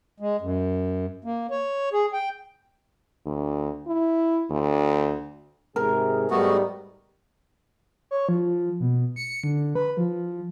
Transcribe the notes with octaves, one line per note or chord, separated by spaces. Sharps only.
G#3
F#2
A#3
C#5
G#4
G5
D2
E4
D2
G#2 C3 G#4 A#4
G#2 G3 A3 B3 F#4
C#5
F3
B2
C#7
D3
B4
F3